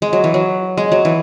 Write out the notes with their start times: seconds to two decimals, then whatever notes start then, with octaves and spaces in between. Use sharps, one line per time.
0.02 G#3
0.13 F#3
0.24 E3
0.34 F#3
0.77 G#3
0.92 F#3
1.05 E3